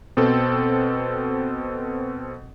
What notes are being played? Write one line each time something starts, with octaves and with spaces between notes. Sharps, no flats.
B2 C4 A4